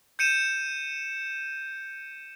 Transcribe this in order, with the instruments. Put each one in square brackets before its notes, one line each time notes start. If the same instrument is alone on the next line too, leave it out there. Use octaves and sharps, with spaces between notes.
[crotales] G6 C#7 D#7 E7